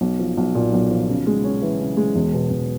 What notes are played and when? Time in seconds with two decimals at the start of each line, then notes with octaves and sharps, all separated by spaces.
0.01 B1
0.19 F3
0.37 B1
0.55 A#2
0.73 B1
0.91 F3
1.09 C#3
1.27 G#3
1.44 C#4
1.62 E3
1.80 C#3
1.97 G#3
2.16 E1
2.33 B2
2.51 E1